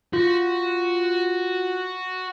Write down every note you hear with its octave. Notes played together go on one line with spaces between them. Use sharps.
F4 F#4